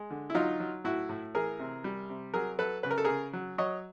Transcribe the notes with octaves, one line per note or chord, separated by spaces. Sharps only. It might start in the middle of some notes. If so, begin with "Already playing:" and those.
Already playing: G#3
D3
E4
F#3 D#4 F4
F#3
A2 E4 F#4
A2
E3 G#4 A#4
C3
G3
C3
F#3 G#4 A#4
F#3 A4 B4
C#3 B4
A#4
A4
C#3 G#4 A#4
F#3
F#3 C#5 D#5